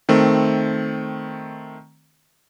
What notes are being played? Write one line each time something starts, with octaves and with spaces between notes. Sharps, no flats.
D#3 A3 C4